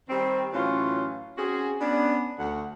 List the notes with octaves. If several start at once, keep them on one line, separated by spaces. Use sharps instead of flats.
D#3 G3 C4
A2 E3 F#3 C#4 F4
C4 C#4 F#4 G#4
B3 C#4 D4
D2 F#5